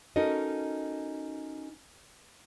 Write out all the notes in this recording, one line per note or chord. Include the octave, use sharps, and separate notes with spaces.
C#4 D#4 F#4 A4 A#4 D#5